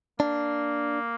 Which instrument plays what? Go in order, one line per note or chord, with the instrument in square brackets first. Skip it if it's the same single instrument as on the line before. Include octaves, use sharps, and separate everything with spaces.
[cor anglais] A#3 [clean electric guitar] D4